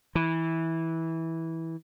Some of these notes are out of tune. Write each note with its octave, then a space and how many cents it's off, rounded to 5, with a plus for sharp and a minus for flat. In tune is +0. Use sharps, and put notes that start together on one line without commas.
E3 -15